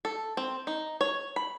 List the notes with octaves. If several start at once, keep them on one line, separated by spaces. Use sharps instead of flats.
A4
C4
D#4
C#5
B5